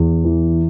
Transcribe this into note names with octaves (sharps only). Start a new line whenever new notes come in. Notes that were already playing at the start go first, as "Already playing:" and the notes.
Already playing: E2
E3